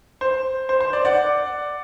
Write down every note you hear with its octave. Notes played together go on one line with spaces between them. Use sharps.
C5
C5
C5
D5
D5 F#5